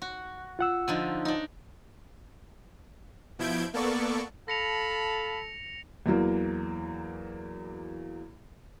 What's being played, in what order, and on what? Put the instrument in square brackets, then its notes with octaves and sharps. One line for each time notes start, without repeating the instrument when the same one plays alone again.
[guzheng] F#4
[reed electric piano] F4 F#5 E6
[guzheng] D3 F3 D#4
D4 D#4
[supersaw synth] B2 F3 E4 G6 G#6 D7
A#3 B3 A4 D5 C#6
[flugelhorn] A4 [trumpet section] F5 A5 B5 [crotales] A#6 C#7 F7
[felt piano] E2 E3 F#3 A#3